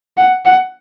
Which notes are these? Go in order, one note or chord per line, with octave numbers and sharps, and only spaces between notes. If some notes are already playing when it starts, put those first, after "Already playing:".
F#5
F#5